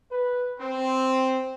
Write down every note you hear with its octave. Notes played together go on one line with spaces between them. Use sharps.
B4
C4